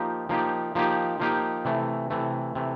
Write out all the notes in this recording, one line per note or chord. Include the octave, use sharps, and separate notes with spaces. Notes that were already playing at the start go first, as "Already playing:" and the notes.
Already playing: F3 A#3 D#4 G4
F3 A#3 D#4 G4
F3 A#3 D#4 G4
F3 A#3 D#4 G4
C3 E3 A3
C3 E3 A3
C3 E3 A3